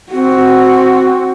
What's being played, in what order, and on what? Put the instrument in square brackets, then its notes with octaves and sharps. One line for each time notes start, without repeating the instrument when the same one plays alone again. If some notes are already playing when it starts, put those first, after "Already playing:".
[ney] C4 [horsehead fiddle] F#4